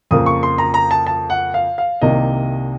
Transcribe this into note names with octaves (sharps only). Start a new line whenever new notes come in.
F2 C#3 F3 A#3 D#6
C#6
C6
A#5
A#5
A5
A5
F#5
F5
F5
C2 C3 D#3 A#3 D#5